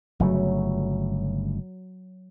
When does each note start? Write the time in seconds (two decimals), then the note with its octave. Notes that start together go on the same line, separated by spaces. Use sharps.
0.20 G1 C#3 F#3 A3